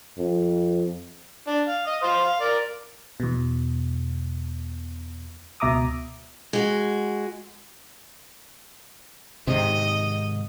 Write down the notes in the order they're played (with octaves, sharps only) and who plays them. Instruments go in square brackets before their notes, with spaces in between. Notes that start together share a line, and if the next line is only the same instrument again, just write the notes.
[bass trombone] F2
[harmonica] D4
F5
D#5 D#6
C5 F5 C6
F5
A#4 D5
[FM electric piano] E2 B2
C#2 B2 E5 A#5 D6 D#6
[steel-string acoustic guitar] G#3 F#4
[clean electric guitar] G#2 D#3 [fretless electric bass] C3 [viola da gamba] D#5